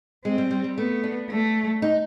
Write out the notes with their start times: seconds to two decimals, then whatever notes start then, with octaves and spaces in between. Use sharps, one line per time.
0.25 G#3 C4
0.38 G3
0.51 G3
0.64 G3
0.78 A3 B3
1.03 D4
1.29 A3 D4
1.82 D#4